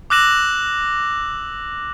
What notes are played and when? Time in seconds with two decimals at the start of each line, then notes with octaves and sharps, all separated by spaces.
0.10 D6 E6 F#6 A#6 E7 F#7